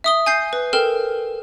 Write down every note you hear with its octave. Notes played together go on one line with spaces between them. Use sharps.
E5 D#6 G7
G#5 G6 C7
B4
A4 A#4 G5 F6 E7